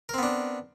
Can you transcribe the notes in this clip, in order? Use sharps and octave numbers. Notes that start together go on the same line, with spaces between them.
B3 C4 D4 A#4